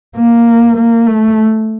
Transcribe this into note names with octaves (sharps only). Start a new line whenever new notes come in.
A#3
A#3
A3